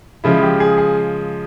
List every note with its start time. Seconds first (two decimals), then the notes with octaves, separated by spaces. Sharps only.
0.24 C#3 F3 G#3 E4
0.42 G4
0.60 G#4
0.78 G#4